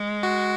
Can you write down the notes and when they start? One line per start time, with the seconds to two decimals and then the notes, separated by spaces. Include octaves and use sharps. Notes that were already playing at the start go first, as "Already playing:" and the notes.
Already playing: G#3
0.23 F#4